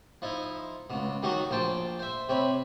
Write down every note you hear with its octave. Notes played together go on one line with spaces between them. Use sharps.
F3 D#4 E4
C#2 B2
D#3 F#3 G3 D#4 F#4
A#1 A#2 C5 G5 A5
C5 E5
C3 C4 C#5 B5